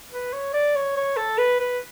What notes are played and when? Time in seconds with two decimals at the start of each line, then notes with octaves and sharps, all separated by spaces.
0.11 B4
0.33 C#5
0.54 D5
0.76 C#5
0.96 C#5
1.17 A4
1.38 B4
1.60 B4